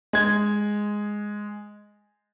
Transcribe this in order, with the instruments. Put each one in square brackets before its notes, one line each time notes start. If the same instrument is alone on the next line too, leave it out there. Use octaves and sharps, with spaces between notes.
[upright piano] G#3 G#6